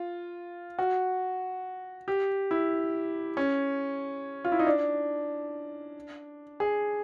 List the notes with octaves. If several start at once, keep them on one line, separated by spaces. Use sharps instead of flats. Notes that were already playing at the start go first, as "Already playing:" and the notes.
Already playing: F4
F#4
G4
E4
C#4
F4
E4
D#4
D4
G#4